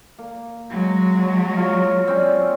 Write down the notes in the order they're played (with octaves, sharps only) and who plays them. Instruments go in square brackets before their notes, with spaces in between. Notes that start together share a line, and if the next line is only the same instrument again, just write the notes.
[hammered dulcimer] A#3
[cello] F#3 G#3
[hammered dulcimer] F#4
F4 C#5
C4 C#4 D5